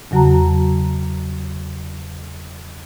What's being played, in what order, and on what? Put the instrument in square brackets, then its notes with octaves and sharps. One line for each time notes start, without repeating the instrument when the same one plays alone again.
[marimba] E2 C#3 F#3 F#4 A5 A#5